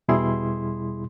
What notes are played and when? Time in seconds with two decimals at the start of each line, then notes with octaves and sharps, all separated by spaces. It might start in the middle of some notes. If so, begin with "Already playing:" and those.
0.08 E2 B2 G3 E4 G#4 C6